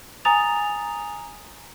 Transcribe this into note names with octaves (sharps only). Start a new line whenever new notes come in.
G#5 A#5 D#6 A6 F7